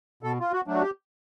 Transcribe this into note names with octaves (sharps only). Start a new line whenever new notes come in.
B2 A4
F4
F#4
F#3 A3 D4
F#4
G4